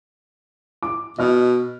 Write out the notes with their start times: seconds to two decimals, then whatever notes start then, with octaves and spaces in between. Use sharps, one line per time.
0.83 D6
1.18 B2 D#5 F6